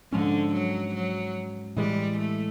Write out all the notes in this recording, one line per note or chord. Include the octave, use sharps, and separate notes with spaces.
G#2 D3 F3 G#3 C#4
F#3
F#3
A2 E3 G3 G#3
A3